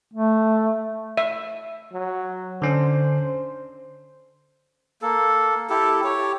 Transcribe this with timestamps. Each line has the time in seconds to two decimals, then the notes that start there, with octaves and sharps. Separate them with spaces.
0.13 A3
1.17 E5
1.93 F#3
2.62 D3 C#4 D4 C5
5.02 A#3 A4
5.70 E4 G4 A4
6.04 G4 C#5